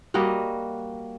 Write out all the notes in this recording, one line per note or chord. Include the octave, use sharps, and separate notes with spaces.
G3 A#3 F#4 D#5